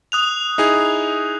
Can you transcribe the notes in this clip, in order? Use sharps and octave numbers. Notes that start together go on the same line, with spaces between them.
D#6 F#6 F7
D#4 E4 G#4